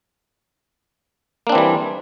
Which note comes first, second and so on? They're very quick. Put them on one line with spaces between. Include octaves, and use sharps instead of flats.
A#3 D4 C4 E3 G3